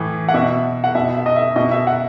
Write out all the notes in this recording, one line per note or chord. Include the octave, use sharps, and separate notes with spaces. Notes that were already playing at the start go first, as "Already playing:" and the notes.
Already playing: A2 E3
F#5
B2 E5
F#5
B2 E5
E5
D#5
E5
B2 D#5
E5
F#5